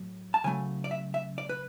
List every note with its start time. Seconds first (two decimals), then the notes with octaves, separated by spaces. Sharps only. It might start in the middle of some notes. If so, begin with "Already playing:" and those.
Already playing: A2 F#3 A3
0.34 A5
0.44 C#3 F#3 A3 G#5
0.84 D5
0.91 E5
1.14 E5
1.38 D5
1.49 B4